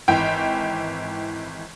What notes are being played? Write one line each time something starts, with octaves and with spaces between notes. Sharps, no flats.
G#1 E3 G5